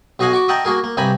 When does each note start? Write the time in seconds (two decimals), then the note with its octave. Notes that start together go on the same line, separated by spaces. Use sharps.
0.19 B1 F#4 D#5 F5 F#5 G#5
0.33 F#4 C#6 D6
0.48 D#5 E5 F#5 G5 A5 A#5
0.65 A#3 F#4 G#4 A#4
0.84 A#3
0.97 C2 G2 G4 G#5 A#5 B5